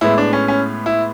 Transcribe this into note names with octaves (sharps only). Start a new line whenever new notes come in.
A2 G#3 B3 E4
D4
C#4
C#4
E4